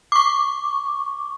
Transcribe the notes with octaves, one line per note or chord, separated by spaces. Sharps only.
C#6 D6